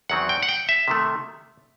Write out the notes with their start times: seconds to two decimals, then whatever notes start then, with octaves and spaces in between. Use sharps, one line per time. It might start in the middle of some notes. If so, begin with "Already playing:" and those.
0.09 E2 D#3 F#3 C4 F#5
0.29 G5
0.42 F#5
0.48 G5
0.69 E5
0.88 C3 D#3 A3